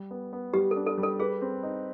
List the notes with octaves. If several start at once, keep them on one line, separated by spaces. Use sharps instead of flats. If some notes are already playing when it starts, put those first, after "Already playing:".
Already playing: G3
B3
B3
G3 G4
A4
D4
A4
G3
A4
G#4 B4
C4
D#4